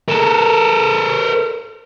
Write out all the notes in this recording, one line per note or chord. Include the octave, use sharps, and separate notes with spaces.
A4 A#4